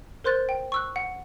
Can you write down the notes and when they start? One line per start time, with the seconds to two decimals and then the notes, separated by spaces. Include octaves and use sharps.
0.24 A#4 C5 C6 F#6 A6
0.49 G5
0.72 C#6 E6 F#6
0.96 F#5